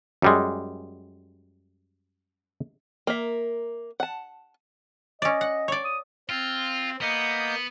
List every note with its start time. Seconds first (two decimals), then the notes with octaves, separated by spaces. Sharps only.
0.22 F#2 G3 G#3
3.07 A#3 E5
4.00 F#5 A5
5.22 C#4 D5 D#5
5.41 F#5
5.68 C#5 D5
5.84 D#6
6.29 C4 F4
7.01 A#3 B3 D#5 G6